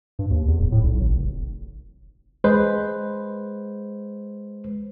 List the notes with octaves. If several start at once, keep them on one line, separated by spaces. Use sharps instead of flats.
G2
D#2
E2
D1
A2
B1
G#1
F1
G#3 B4 C5